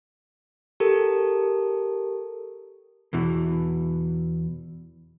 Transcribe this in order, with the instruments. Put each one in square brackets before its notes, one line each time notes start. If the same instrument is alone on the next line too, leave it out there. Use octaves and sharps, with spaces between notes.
[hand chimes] G4 A4 A#4
[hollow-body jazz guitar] E2 B2 E3